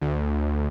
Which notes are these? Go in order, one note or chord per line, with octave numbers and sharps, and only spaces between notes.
D2